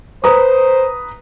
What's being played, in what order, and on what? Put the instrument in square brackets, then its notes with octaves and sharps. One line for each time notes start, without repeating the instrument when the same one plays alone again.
[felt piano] B4 A#5 D#6 [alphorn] C5